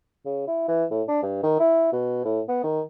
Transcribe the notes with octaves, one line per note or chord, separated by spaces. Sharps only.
C#3
E4
E3
A2
D4
G2
D#3
E4
B2
A2
B3
D#3